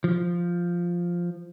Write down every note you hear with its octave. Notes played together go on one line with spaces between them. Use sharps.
F3